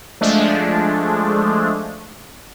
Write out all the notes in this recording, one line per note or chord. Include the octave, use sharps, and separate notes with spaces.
F3 G#3 A3 D4